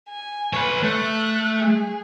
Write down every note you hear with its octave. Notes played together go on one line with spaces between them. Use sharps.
G#5
B4 C#5
A3 F#6
G#4